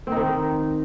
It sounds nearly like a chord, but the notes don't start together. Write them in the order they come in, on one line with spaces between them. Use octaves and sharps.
C4 D#4 D#3